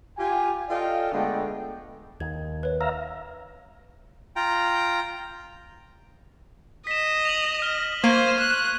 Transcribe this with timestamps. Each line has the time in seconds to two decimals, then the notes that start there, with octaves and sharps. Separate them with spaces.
0.18 F4 G4 G5 G#5
0.69 F4 A4 D5 D#5 F5 G5
1.13 D3 G#3 A3 B3 D5 G5
2.20 D#2 G#6
2.63 B4 C#5
2.81 E5 F5 A#5
4.36 F4 G5 A#5
6.87 D#5 B6 E7
7.25 F7 F#7
7.62 F6 G7
8.04 A#3 C5 C#6 G#6 D#7
8.40 F#6